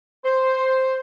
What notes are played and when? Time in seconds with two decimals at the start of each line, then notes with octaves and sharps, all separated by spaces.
0.25 C5